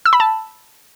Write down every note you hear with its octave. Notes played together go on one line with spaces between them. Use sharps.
E6
B5
A5